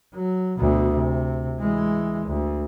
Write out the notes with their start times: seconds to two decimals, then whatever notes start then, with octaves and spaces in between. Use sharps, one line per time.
0.13 F#3
0.58 D2 B2
0.94 C3
1.59 E3 G#3
2.26 D2